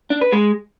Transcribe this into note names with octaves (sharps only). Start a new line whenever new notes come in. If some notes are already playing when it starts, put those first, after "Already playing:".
D4
B4
G#3